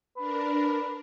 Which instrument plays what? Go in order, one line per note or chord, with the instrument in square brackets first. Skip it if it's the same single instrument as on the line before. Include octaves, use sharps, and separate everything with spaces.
[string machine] D4 A#4 [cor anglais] B4